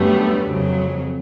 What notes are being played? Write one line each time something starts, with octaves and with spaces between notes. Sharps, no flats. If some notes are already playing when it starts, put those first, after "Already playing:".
Already playing: F#2 D3 G3 A3 B3
F2 C#3 F#3